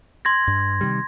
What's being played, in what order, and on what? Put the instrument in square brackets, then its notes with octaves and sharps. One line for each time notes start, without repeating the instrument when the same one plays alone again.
[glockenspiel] C6 G#6 A#6
[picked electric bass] G2
C3 D#3 G3